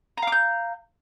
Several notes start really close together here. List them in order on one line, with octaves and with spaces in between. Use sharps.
A#5 F5 D6 G6